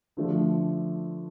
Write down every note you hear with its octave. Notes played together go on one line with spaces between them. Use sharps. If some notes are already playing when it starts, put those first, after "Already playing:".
D3 F3 A3 D4